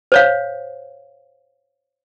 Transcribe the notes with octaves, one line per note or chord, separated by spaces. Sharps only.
C5 C#5 F5